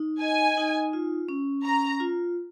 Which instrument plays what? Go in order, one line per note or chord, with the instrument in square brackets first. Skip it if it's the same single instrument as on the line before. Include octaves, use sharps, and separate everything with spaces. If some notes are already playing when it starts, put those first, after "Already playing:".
Already playing: [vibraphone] D#4
[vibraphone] D#5 [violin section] G#5
[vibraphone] D#4
F4
C#4
[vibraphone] C#4 [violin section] A#5
[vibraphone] F4